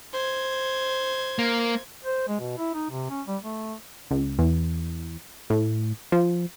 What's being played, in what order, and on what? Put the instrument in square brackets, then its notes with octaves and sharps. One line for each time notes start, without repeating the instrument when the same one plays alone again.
[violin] C5 G#6
[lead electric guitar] A#3
[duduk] C5
G#3
B2
E4
D#4
C3
C#4
G3
A3
[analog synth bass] C#2
E2
A2
F3